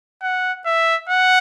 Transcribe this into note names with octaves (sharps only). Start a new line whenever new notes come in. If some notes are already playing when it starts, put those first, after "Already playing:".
F#5
E5
F#5